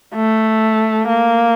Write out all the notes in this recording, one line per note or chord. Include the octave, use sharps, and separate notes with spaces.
A3
A#3